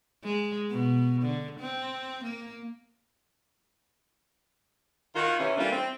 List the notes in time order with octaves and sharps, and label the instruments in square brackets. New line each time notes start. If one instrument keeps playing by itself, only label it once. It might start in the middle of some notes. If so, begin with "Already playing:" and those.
[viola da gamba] G#3
B2
D3
C4
A#3
[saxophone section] D#3 F4 F#4
C3 E3 C#4
E3 G3 A3 A#3 D4 F4
C4